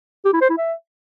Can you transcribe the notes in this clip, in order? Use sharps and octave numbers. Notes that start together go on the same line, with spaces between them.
G4
E4
C5
E4
E5